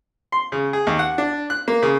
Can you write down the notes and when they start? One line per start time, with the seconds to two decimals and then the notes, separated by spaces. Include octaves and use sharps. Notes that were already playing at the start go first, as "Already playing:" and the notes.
0.32 C6
0.52 C#3
0.73 G#4
0.87 D#2
0.99 F#5
1.18 D4
1.50 F#6
1.68 A#3
1.83 C#3